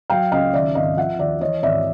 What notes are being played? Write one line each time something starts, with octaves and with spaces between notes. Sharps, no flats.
F#3 F5 G5
C#2 D#5 F5
D#3 D5 E5
G#1 D#5 F5
F3 E5 F#5
D#2 D5 E5
E3 C#5 D#5
G#1 D5 E5